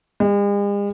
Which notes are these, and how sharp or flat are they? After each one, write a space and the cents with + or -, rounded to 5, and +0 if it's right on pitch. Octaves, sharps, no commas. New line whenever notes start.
G#3 -45